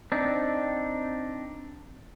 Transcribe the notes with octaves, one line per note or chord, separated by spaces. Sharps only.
C4 D4 D#4